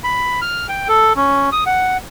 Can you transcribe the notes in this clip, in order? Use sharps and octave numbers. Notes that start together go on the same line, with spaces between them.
B5
F6
G5
A4
C#4
D#6
F#5